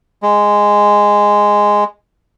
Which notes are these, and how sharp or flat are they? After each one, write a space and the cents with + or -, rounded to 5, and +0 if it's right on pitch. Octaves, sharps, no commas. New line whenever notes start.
G#3 -5